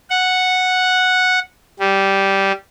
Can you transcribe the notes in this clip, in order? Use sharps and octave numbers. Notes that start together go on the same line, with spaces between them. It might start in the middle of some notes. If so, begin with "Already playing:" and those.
F#5
G3